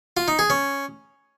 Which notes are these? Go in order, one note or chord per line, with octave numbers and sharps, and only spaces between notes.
F4
D#4
G#4
C#4